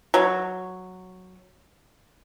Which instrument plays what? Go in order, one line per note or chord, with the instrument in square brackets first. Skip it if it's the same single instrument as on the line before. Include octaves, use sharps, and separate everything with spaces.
[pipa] F#3